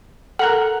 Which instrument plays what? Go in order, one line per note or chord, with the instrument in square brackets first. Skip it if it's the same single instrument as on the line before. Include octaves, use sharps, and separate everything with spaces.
[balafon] A4 A#4 [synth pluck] F#5 A#5 F#6